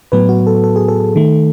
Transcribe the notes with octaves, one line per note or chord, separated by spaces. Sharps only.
A2 F#3 B3 B4
F#4
A4
A4
G#4
A4
D#3 A3